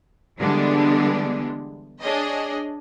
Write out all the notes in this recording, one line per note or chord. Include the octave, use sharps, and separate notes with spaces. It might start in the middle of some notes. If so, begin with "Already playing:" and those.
D3 E3 G3 G#3 B3 D4
D4 G#4 C#5 D#5